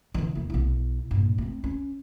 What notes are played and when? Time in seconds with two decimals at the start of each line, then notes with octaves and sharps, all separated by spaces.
0.14 D3 E3
0.35 E1 A3
0.50 B1 E4
1.11 G2 A#2
1.38 A3 C4
1.64 C#4